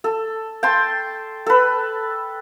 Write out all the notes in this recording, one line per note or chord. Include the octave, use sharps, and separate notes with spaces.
A4
G5 A5 C6
A4 B4